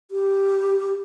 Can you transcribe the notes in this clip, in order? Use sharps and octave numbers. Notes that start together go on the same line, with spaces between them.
G4